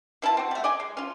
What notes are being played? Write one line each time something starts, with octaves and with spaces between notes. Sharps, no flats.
B2 E4 F4 A5
C4 F#4
G3 A3
D5 D#5 G#5
G#3
C#4 F4